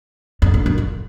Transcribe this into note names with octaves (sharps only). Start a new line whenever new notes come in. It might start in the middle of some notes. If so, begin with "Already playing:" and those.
F2
F2
F#2
F2